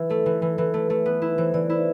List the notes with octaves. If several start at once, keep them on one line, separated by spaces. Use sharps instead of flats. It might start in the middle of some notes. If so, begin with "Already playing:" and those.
Already playing: E3 E4
A3 A4
E3
E3
E3 B4
A3 A4
A3 A4
B3 B4
E4
E3 C5
E3 D5
E4